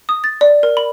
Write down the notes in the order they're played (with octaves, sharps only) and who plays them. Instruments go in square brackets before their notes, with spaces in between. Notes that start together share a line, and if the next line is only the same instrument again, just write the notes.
[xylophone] D#6
A6
D5
A#4
B5